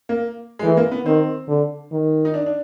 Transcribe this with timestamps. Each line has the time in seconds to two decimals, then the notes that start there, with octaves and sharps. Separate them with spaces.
0.09 A#3
0.59 G#3
0.63 E3 A3
0.77 A#3
0.91 B3
1.05 D#3 C4
1.48 D3
1.92 D#3
2.25 D#4
2.34 D4
2.46 D4